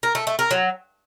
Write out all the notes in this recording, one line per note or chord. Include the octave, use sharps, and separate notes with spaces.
A#4
A3
A3
A#4
F#3